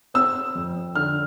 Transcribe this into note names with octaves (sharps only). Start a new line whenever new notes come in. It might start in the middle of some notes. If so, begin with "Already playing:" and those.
C4 E6
F2
D3 F6